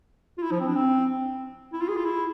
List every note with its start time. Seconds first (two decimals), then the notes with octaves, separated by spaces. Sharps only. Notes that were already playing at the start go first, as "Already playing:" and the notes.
0.38 F4
0.43 E4
0.51 F3
0.60 C4
0.67 D4
0.76 C4
1.73 E4
1.81 F4
1.89 G#4
1.97 F4
2.05 E4